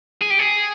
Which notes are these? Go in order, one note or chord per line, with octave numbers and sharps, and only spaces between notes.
G#4
G4
G#4